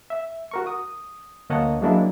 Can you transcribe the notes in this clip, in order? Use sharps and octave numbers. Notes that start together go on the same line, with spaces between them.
E5
F#4 A#4 C#6
D#6
D2 A#3 C#5 D#5 F#5 A5
F#3 G#3 A#3 D4 E4